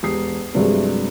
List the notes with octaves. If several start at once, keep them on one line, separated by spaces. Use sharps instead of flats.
E1 G4 D#6 C7
G2 C3 F#3 G#3 A3 D4